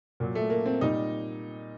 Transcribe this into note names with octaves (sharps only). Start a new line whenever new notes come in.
A#2 F#3
A3
A#3
C4
A#2 G3 D#4